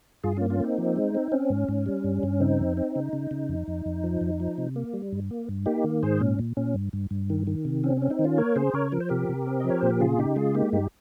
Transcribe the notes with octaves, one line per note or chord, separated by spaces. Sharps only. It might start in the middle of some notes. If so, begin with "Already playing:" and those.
G2 F4 G#4
A#3 C#4 F4
C#4 F4
A#3 C4 D#4
F3
G#3
C4
C4 C#4
G#2
G#2
G3
G2
G2
C#3 C4 D#4
F2
C4
C#3
C#3
C#3
F2
F2
F2
F3
F2
F3
C3
A#3
G3
G2
A#3
G2
A#3 D#4 G4
D#3
G#2 G#4 C5
A#2 C#4
A#2
A#2 C#4
G2
G2
G2
D#3
D#3
C3
C4 C#4
C4 C#4
C4 D#4
D#3
C#4 F4
A#3 A#4 C#5
C#3 G#4 C5
C#3 A#4 C#5
F3 A#4
C5
C3 G4 A#4
C3
C4
F3 D#5
C#5
A#2 C5
A#4
C#3 F4 G#4
C#3 D#4 G4
G#3 F4 G#4
A#3 D#4 G4
G2 D#4 G4